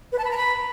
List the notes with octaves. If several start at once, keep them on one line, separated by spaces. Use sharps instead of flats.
B4
A5
B5
A#5
B5